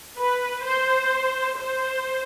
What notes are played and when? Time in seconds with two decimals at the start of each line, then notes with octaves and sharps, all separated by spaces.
0.17 B4
0.63 C5
1.57 C5